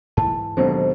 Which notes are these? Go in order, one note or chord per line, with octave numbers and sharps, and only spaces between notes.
G#2 E3 A5
D#2 B2 D3 F#3 G#3 C5